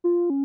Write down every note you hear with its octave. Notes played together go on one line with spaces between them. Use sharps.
F4
C#4